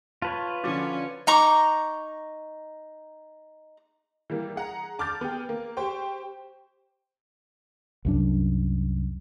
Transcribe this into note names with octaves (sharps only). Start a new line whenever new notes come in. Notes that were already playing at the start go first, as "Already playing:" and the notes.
F4 B4 C#5 A5
D3 F3 C#4 D6 A6
D#4 A#5 C#6 D6
E3 G3 A#3
G#4 F#5 A#5
A5 D6 F6 G6 A6
B3 G#4 G5
A#3
G4 C5 G5 C#6
C2 F#2 D4